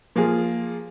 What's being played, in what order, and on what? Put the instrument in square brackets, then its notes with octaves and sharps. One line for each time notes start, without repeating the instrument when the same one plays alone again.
[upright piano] F3 A#3 F4 G#4